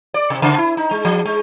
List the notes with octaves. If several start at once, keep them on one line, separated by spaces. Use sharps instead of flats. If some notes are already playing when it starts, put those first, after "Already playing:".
D5
C3
C#3
E4
D#4
G#3
F3
G#3